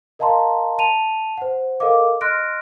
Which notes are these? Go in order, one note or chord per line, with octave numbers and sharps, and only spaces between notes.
A#4 D#5 F5 A5 A#5 C6
A5 D#7 F7
C5 F#5
A4 A#4 D#5 F5 D6
D#5 C6 F6 F#6 A#6 D7